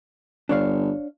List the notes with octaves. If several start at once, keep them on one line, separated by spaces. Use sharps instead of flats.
G1 D4 C#5 F5